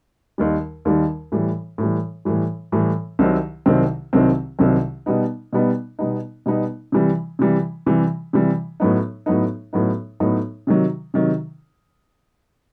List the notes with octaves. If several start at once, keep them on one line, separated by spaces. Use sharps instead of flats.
D#2 D#3 G3
D#2 D#3 G3
A2 E3 G3
A2 E3 G3
A2 E3 G3
A2 E3 G3
C2 C3 D#3 F#3 C4
C2 C3 D#3 F#3 C4
C2 C3 D#3 F#3 C4
C2 C3 D#3 F#3 C4
B2 G3 B3 D#4
B2 G3 B3 D#4
B2 G3 B3 D#4
B2 G3 B3 D#4
C3 E3 G3
C3 E3 G3
C3 E3 G3
C3 E3 G3
A2 F#3 B3 D#4
A2 F#3 B3 D#4
A2 F#3 B3 D#4
A2 F#3 B3 D#4
C3 D#3 F#3
C3 D#3 F#3